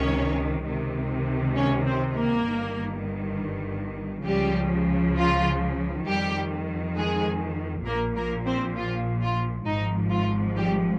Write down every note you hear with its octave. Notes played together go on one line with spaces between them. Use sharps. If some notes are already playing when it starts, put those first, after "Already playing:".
Already playing: C#2 C3 D#3 C#4 C#5
C#2 C3 D#3
C#4 C#5
C4 C5
A#3 A#4
G1 G2 D#3
C#2 C#3 F3 G3 G4
F4
F2 D#3 G3 G4
G#3 G#4
A#1 A#2 F3 A#3 A#4
A#3 A#4
C4 C5
F4
F4
G#1 G#2 F3 D#4
F4
G3 G4